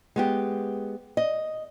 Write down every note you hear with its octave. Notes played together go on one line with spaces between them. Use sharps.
G#3 B3 G4
D#5